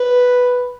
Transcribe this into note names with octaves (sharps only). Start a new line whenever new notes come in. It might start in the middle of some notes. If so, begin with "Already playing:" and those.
Already playing: B4